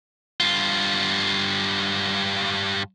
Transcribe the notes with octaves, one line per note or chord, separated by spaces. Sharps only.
G2 F4